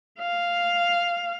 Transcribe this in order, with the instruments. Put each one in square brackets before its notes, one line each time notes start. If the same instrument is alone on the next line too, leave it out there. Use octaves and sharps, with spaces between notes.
[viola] F5